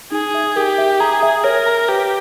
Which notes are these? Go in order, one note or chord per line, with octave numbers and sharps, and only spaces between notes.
D#4 G#4
E5
G4 A#4
E5
G#4 A#5
E5
A#4 C#5
A#5
G4 B4